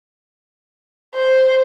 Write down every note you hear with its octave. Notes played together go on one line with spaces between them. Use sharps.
C5